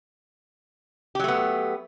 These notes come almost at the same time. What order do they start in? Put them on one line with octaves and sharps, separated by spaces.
G4 F#3 A3 B3